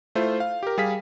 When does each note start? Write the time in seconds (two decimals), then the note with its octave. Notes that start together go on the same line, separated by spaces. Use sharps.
0.15 A3 E4 F4 C5
0.40 F5
0.63 G4 A#4
0.78 G3 G#4 F5 B6